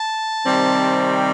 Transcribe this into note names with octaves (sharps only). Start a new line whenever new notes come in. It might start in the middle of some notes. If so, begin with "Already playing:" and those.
Already playing: A5
C3 D#3 G3 C4